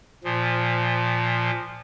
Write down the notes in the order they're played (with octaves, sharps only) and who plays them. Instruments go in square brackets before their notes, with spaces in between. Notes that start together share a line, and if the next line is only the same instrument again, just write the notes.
[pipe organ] A#2 F3